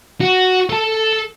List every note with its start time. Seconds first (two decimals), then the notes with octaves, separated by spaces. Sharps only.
0.20 F#4
0.70 A4 A5